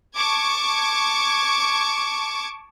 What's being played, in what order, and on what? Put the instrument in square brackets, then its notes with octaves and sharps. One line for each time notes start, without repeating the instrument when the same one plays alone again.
[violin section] A5 C#6 D6 G#6